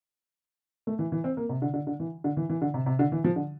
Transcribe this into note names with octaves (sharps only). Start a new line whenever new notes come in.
A3
E3
E3
C4
A#3
C3
D3
D3
D3
E3
D3
E3
E3
D3
C3
C3
D3
E3
F3
D3